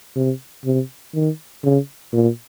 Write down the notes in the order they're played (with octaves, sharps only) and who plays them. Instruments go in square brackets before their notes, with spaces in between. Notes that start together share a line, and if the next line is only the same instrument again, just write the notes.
[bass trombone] C3
C3
D#3
C#3
A#2